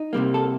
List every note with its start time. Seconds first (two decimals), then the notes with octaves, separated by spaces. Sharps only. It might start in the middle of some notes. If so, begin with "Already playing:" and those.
Already playing: D#4
0.13 C2 C3 G3 A#3
0.34 A4